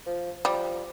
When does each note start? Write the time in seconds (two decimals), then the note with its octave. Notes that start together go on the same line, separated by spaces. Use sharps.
0.06 F3
0.45 F3 G3